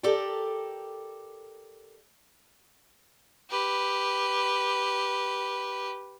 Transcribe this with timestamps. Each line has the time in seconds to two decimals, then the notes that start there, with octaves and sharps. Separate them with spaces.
0.03 G4 A4 A#4 D5 G5
3.51 G4 B4